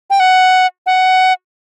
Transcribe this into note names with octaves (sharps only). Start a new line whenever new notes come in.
G5
F#5
F#5